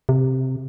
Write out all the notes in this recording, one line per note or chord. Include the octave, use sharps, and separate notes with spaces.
C3